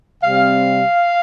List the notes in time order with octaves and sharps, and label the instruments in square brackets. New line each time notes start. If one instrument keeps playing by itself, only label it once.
[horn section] C3 G3 C4 F5